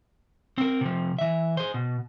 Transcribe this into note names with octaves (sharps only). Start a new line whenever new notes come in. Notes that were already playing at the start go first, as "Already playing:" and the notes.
C4 A#4
C3 F3
E3 E5
G#4 C5
B2